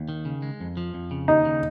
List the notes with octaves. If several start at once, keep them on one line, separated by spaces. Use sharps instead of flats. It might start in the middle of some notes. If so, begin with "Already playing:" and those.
Already playing: D#2
D#3
C#3
G#3
F2
F3
F2
C#3
D#2 D#4
C#3